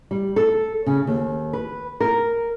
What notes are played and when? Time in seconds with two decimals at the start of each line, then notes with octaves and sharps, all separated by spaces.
0.11 G3
0.36 A4
0.86 C#3
1.07 D#2
1.53 B4
2.00 A#4